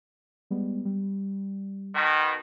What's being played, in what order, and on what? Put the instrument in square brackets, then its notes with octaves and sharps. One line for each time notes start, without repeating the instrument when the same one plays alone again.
[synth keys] G3 G#3 B3
G3
[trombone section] B2 D#3